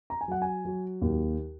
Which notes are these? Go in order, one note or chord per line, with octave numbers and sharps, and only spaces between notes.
A#5
G#5
F#3 F#5
G#5
F#3
D#2